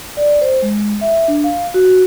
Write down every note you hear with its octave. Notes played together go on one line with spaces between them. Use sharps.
D5
C5
G#3
E5
D4
F5
F#4